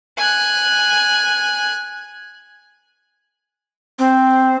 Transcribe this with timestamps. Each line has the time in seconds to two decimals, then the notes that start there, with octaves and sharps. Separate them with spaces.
0.17 G#5 F#6
3.99 C4